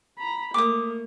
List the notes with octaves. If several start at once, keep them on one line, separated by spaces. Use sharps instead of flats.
A#5 B5
A3 A#3 D6 D#6